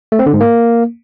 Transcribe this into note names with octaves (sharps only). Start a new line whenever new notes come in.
A3
C4
D3
G#2
A#3